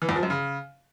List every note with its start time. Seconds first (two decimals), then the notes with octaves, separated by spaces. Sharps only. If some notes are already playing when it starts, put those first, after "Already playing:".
0.02 E3
0.09 E2
0.16 F3
0.23 F#2
0.30 C#3